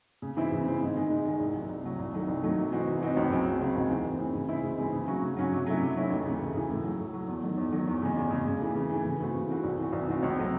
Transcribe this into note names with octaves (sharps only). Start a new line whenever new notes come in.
C#3
E3 C4 E4
C#3
E3 C4 E4
G#2
D#3 G#3
G#2
D#3 G#3
C2
C3 F#3
C2
C3 F#3
C2
C3 D#3 F#3 A3
C2
C3 D#3 F#3 A3
C3
E3 C4 D#4 F#4
C3
E3 C4 D#4 F#4
C#2
C#3 F#3 C4 F#4
C#2
C#3 F#3 C4 F#4
D#2
C#3 E3 C4
D#2
C#3 E3 C4
C#3
E3 G#3 C4 E4
C#3
E3 G#3 C4 E4
C#3
F#3 C#4 F#4
C#3
F#3 C#4 F#4
C3
F#3 A3 C#4 E4
C3
F#3 A3 C#4 E4
D#2
C#3 E3 A3
D#2
C#3 E3 A3
A2
F#3 A3
A2
F#3 A3
E2
D#3 F#3 A3
E2
D#3 F#3 A3
E2
C#3 G#3
E2
C#3 G#3
C#3
E3 A3
C#3
E3 A3
C#3
E3 A3 C4 F#4
C#3
E3 A3 C4 F#4
C2
C3 E3 C4 F#4
C2
C3 E3 C4 F#4
C#2
C3 F#3 A3 C4